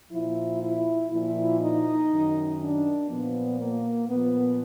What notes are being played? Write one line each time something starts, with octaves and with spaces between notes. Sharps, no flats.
A#2 F3 E4
E4
A#2 F3 E4
D#4
F#2 D#3
D4
A#2 F3 B3
A#3
A#2 F3 B3